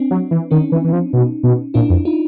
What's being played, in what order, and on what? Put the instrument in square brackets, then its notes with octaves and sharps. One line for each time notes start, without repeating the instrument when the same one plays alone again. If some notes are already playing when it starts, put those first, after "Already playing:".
Already playing: [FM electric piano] C4 D4
[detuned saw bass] F#3
E3
[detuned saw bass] D#3 [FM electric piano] C#4 D#4
[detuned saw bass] E3
E3
F3
B2
B2
[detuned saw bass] A#2 [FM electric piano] D4 E4
[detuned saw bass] F2
[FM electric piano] D#4 F4